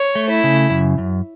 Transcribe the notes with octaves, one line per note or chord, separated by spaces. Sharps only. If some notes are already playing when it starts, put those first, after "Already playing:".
Already playing: C#5
A3
E4
C#3
F#2
F#2